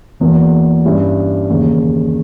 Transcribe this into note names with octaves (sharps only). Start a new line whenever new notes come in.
E1 E2 B2 A#3
G2 G3 C#4 E4
E1 D#2 C#3